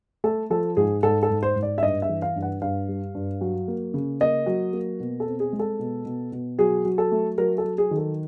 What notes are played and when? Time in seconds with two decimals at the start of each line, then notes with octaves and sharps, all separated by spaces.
0.24 A3 A4
0.50 F3 A4
0.77 G#2 G#4
1.03 G#2 A4
1.23 A4
1.30 G#2
1.43 C5
1.56 G#2
1.63 D5
1.78 E5
1.83 G2 D#5
2.02 E5
2.09 E3
2.22 F5
2.36 G2
2.42 F#5
2.62 G2 F5
2.88 G3
3.15 G2
3.41 F#3
3.68 A#3
3.94 C#3
4.21 A#3 D#5
4.46 F#3
4.73 A#3
5.00 B2
5.20 A4
5.27 C4
5.40 G#4
5.53 G#3
5.59 A4
5.79 B2
6.06 B2
6.32 B2
6.58 F#3 G#4
6.85 F#3
6.98 A4
7.12 A3
7.38 F#3 A#4
7.58 A4
7.64 F#3
7.78 G#4
7.91 D#3
7.97 A4